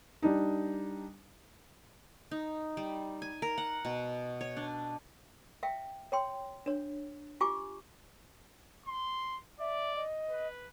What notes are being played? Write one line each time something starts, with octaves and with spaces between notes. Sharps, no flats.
G3 D4 D#4
D#4
G3
G#5
A#4
F#5
B2
C#5
D4
E5 F5 G5
C#5 G5 C6
D4 C#5
F4 G4 G#5 C#6 D6
C6
D5 E5
D#5
B4